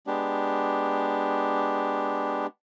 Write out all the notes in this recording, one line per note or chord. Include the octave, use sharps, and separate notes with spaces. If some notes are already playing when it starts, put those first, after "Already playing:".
G#3 B3 D4 G4